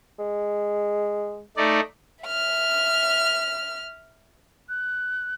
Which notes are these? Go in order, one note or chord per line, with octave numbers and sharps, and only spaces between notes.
G#3
A3 D#4 D5
E5 F6
F#6